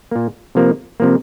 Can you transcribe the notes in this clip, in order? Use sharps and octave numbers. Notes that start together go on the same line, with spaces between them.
A#2 A#3
C3 F3 A#3
C3 F3 A#3